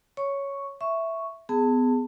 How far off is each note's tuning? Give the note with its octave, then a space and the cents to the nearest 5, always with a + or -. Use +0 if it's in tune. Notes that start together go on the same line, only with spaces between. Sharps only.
C#5 +5 C#6 +0
E5 +0 C#6 +0
B3 +25 G#4 +0 A5 +20